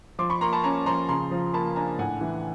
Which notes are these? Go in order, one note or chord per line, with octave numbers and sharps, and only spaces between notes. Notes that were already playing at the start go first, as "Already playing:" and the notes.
F3 C6 D6
B5 C#6
A#3 A#5 C6
A5 B5
C#4 G#5 A#5
F3 A#5 C6
C#3 A#5 C6
F3
A#3 A5 B5
D4 G#5 A#5
A2 F#5 G#5
E3